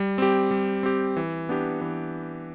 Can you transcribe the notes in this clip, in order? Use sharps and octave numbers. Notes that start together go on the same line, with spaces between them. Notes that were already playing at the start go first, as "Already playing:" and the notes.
Already playing: G3
C4 G4
G3
C4 G4
E3
B3 D4 G4
E3